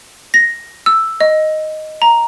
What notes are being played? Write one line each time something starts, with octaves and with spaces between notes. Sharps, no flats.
A#6
E6
D#5
A#5